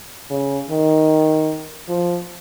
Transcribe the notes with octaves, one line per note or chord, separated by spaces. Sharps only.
C#3
D#3
F3